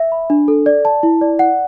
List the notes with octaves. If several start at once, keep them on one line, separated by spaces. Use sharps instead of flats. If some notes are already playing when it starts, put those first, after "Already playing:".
Already playing: E5
B5
D4
A4
D5
A5
E4
D5
F#5